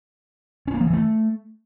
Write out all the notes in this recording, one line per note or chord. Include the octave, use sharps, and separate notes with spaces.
C#4
A#3
F3
E3
A3